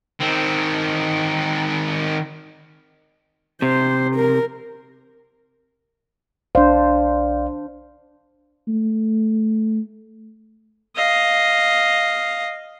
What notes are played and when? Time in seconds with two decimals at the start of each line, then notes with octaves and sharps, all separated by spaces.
0.20 D#3 C4
3.62 C3 C5
4.16 A#4
6.55 B1 D4 C5 D5 F5
8.68 A3
10.96 D#5 F5